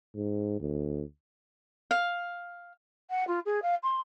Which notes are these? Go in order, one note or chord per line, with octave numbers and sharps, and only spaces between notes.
G#2
D2
F5
F#5
F4
G#4
F5
C6